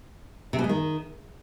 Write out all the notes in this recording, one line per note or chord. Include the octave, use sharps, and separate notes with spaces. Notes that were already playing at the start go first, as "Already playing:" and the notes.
C3
B2
G#3
D#3